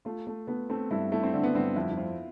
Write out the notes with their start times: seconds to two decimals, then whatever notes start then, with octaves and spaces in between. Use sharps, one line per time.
0.05 A3 F4
0.27 A3
0.47 A3 B3
0.70 A3 C4
0.91 G2 E4
1.12 A3 E4
1.23 C4
1.33 D3 D4
1.43 B3
1.55 G2 C4
1.76 F2 E4
1.89 E4
1.97 C4 F4